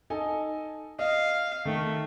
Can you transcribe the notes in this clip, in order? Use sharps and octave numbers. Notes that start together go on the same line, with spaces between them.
D#4 A4 G#5
D#5 F5
D#3 A3